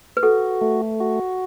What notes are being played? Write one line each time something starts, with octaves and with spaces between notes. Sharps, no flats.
B4
F#4 A4
A3
F#4